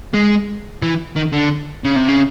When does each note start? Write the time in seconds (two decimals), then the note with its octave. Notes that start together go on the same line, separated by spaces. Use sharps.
0.14 G#3
0.83 E3
1.16 D#3
1.33 D3
1.84 C#3
1.96 C3
2.08 C#3